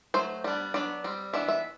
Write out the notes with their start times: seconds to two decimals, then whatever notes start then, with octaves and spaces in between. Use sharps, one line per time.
0.14 F#3 A3 C5
0.44 G3 B3 D4
0.74 F#3 B3 D4 D5
1.04 G3 C4
1.33 E3 B3 D4 E5
1.48 E5